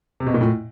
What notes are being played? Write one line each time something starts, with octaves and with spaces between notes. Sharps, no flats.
C3
B2
A#2
A2